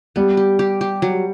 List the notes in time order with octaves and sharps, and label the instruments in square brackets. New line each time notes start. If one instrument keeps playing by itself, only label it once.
[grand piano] G3 [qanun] B3
[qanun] G4
G4
G4
F#3